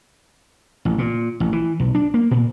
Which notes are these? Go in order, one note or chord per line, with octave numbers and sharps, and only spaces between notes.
A1
A#2
A1
E3
B1
D4
A#3
A#2